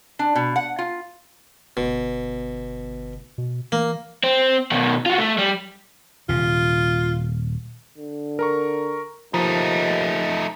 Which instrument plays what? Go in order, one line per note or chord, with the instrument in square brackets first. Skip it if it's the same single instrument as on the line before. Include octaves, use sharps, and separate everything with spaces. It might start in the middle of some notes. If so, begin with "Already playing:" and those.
[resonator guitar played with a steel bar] D4
B2
F#5
F4
[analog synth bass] G1 [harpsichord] B2
[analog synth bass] B2
[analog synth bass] E3 [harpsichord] A#3
[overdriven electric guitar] C4
B2 D#3
F4 F#4
A3
G3
[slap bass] D#1 C3 [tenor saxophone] F4
[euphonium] D3
[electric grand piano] A#4 A#5 C#6
[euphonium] D#2 [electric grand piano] F3 [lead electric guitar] A3 D#4